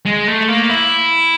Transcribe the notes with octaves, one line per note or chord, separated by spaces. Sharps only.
G#3
A3
A#3
E4